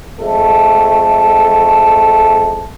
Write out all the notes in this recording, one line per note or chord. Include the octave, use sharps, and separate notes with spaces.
F2 G#3 A3 A4